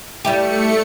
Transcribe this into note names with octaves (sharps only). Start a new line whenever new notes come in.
G3 A3 E4 G4 C#7